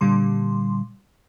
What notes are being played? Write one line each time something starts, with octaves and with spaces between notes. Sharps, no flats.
A#2 D3 G3 C6